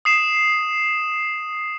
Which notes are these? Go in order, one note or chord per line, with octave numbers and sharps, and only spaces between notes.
D#6 C7 E7